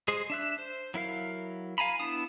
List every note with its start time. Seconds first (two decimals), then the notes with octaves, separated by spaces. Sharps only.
0.08 G#3 G#4 C5
0.30 D4 E5 F#6
0.58 C5
0.94 F#3 E4 A#4 F5
1.78 F5 G#5 A#5 B5
2.00 B3 D4 E4 A5 D#6